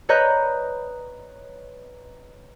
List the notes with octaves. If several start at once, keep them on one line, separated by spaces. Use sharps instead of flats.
B4 C#5 D#5 A#5 F#6 G6